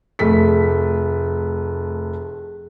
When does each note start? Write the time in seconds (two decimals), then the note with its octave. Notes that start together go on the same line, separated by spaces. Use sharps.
0.19 F1 A3 G#4 B6